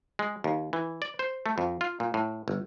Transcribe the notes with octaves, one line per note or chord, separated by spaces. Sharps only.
G#3
D#2
E3
D5
C5
A3
F2
F4
A#2
A2
G1